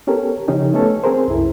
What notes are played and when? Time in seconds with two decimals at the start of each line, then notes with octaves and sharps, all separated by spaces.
0.07 B3 C#4 G4 A4 A#4
0.48 C#3 F3 C#4 D#4 G4
0.74 A3 B3 C#4 A4
1.04 C4 G#4 A#4 C5
1.28 C2 F#2 E4